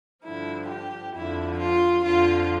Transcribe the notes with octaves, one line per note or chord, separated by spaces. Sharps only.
G2 D3 F3 E4
G4
F2 D3 F3 E4
F4
F2 D3 F3 F4